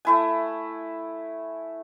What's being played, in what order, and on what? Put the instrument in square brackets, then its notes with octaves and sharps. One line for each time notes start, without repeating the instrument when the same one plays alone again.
[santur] A3 E4 G#5